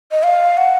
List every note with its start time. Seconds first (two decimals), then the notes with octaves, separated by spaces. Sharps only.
0.11 D#5
0.23 F5
0.57 F#5